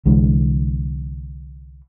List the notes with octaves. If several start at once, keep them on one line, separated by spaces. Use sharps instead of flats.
C2 D3 E3 G#3